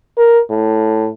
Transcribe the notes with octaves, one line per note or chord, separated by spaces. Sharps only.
A#4
A2